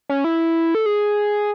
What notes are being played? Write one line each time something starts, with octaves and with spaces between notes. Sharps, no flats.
C#4
E4
A4
G#4